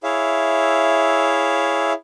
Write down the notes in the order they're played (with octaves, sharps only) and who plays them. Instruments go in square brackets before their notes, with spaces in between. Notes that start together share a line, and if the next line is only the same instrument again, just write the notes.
[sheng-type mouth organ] E4 G#4 C#5 E5 F5